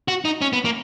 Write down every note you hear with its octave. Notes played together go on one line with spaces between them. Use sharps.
F#4
D#4
C#4
B3
A#3